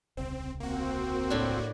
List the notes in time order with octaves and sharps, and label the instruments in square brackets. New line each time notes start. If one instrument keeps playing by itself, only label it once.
[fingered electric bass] D#1 C2 C#3 [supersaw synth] C4
[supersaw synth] A#3 F#4 [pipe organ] C4
[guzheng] A2 D4